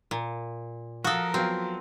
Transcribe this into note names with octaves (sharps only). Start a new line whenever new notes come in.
A#2
F3 F#4 A4 A#4 F5 D#6
F#3 B3 C4 F4